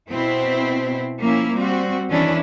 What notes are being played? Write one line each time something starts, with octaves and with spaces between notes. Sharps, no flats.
B2 C4 E4
F3 A#3 C#4 E4
G3 C4 F#4
E2 D#3 C#4 D4 E4